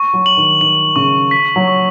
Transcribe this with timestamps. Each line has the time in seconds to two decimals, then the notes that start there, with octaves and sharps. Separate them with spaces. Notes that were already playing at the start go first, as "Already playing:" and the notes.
Already playing: C#6
0.14 F#3
0.26 F#7
0.37 D#3
0.61 D#3 F#7
0.96 C#3 C#6
1.31 B6
1.56 F#3
1.68 C#6